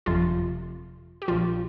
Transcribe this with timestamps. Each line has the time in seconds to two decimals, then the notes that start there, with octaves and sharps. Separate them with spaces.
0.06 G1 F2 C3 F3 F4
1.22 G4
1.28 A#1 A#2 F3 F4